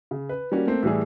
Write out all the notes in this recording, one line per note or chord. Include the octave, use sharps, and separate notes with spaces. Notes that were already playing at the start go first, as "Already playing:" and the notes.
C#3
B4
G3 A#3 C#4 F#4
A3 A#3 C4
A2 E3 G3 G#4